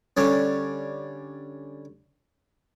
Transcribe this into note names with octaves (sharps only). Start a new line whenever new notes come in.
D3 G3 C#4